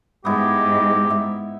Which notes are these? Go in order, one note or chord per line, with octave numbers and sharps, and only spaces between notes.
G#2 B3 E4 G4
E5